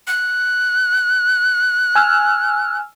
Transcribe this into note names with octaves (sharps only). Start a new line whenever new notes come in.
F#6
G#5 E6 F6